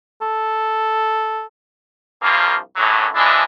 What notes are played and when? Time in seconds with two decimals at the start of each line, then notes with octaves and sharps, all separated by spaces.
0.22 A4
2.21 C2 G2 F3 A#3
2.76 F#2 A2 D3 E3 F#3
3.15 E3 F3 G#3 D4 E4